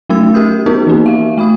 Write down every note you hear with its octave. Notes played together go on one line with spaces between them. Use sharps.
F#3 A3 C#4 E6 G#6
G4 A#4 D#6 G6
B3 D#4 F#4 A#4
E3 A#3
E5 F5
A3 F5 B5 D#6